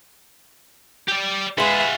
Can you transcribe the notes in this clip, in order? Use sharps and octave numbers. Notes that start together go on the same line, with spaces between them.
G4 D5
G#3 F4 G#4 B4 E5 F#5